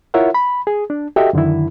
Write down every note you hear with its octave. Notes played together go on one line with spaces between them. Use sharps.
E4 F4 A#4 C#5 E5 F#5
B5
G#4
D4
F#4 G4 A4 D#5 E5 G5
F#2 D3 D#3 E4